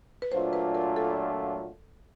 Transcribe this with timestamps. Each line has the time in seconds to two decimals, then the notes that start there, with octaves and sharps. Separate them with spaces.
0.22 B4
0.32 A#2 F#3 A3 D4 F4 C5
0.53 B4
0.75 A#4
0.96 A4